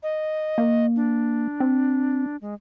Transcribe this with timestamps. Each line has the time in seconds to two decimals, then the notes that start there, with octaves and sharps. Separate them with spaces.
0.03 D#5
0.58 A#3
0.96 D4
1.60 C4
2.41 G#3